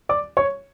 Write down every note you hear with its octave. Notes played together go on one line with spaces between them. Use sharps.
D5 D6
C#5 C#6